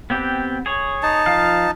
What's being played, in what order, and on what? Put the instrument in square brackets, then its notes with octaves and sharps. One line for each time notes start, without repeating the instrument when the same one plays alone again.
[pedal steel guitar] B3 C4 G4
G#4 C#5
[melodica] D#4 A5
[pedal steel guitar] F3 F5